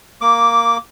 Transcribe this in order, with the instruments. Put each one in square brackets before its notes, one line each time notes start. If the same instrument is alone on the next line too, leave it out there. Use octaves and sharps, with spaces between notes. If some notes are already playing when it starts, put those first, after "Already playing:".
[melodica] A#3 D6